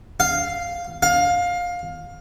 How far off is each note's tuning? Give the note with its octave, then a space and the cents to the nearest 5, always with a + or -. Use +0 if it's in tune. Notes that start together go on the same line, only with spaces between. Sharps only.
F5 +0
F5 +20